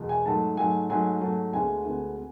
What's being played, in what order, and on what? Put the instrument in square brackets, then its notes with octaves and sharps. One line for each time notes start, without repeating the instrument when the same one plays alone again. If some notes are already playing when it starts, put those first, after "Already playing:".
Already playing: [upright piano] E2 B2 G#3
G#5
G#2 F#3 A3 A5
G#2 F#3 A3 G#5
G#2 F#3 A3 G#5
G#2 F#3 A3
D2 D3 G#3 B3 G#5
D2 D3 G#3 B3
B3